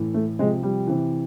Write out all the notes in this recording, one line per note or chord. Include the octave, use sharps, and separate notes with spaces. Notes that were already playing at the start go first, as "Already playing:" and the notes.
Already playing: A2 E3
A3
C3 F3 G#3
G3
C3 E3